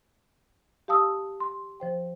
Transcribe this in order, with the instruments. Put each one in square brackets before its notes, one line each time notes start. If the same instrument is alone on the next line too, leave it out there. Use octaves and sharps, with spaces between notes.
[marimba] G4 F5 A5 D#6 E6
C6
F3 C5 G5